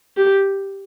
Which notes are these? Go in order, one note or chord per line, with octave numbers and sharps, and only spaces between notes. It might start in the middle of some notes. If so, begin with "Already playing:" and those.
G4